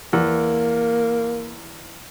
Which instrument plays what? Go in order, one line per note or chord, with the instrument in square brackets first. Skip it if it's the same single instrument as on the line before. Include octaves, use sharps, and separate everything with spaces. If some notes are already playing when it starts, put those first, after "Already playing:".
[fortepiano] E2 [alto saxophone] A#3